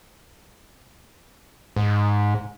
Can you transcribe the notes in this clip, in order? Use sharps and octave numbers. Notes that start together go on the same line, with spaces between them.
G#2